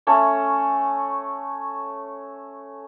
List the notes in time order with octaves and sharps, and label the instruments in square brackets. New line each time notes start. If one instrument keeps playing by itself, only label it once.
[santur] A3 C#4 C#5